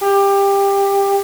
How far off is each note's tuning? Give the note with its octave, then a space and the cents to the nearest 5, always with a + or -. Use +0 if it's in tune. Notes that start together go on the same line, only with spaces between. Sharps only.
G4 +20